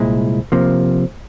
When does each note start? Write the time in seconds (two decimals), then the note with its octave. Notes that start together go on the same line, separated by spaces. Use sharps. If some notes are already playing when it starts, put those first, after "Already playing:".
Already playing: C2 A#2 G#3 E4
0.52 C3 F3 A#3